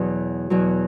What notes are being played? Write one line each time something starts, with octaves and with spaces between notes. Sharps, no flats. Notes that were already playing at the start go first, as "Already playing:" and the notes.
Already playing: E2 B2 F#3
E2 B2 F#3